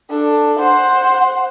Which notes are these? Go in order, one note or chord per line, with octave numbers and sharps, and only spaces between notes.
D4 A4
C5 F#5